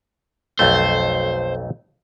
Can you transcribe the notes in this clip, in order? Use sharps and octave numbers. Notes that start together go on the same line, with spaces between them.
B1 F2 A3 C5